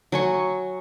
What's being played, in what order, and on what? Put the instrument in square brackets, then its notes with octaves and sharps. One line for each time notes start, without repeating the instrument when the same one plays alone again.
[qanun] F#3 G#5 C#6